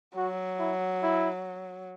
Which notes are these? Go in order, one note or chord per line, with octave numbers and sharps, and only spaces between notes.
F#3 F#4
E4
E4